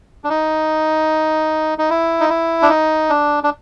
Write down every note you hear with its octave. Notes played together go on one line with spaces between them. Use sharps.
D4
D#4
D#4
E4
D#4
E4
D4
D#4
D4
D4